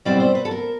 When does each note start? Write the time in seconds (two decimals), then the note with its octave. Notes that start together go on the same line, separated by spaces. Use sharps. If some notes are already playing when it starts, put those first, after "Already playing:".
0.05 B2 G3 C4 E4 D5
0.20 C5
0.35 B4
0.45 A4
0.51 A#4